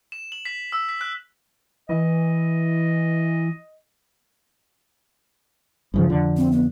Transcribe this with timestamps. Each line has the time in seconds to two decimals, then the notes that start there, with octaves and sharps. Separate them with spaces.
0.12 E7
0.32 F#7
0.45 B6
0.72 E6
0.89 B6
1.01 F#6
1.89 E3 D#5
5.94 G2 C#3 F3
6.09 F2 D3
6.37 C4
6.52 B3